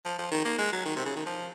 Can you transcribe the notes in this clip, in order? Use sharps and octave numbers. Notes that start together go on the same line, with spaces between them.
F3
F3
D#3
A#3
G#3
F#3
D#3
C3
C#3
D#3
F3